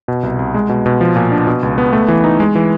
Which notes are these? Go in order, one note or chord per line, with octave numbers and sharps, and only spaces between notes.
B2
C2
C2
G#3
B2
B2
F3
A#2
D4
B2
C#2
B3
A3
E3
D#4
G#3
E3